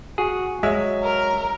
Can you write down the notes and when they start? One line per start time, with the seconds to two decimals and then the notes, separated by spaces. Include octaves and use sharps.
0.18 F#4 G#4
0.63 F#3 G#3 E5
1.03 A#4